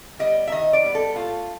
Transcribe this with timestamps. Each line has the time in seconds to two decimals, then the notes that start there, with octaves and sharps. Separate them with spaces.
0.19 G3 B3 D#5
0.47 E5
0.52 D#3 D#5
0.73 D5
0.84 G3 B3
0.95 A4
1.16 A2 F4